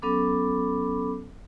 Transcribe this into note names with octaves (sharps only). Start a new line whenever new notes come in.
F#3 B3 C#4 A4 B5 D6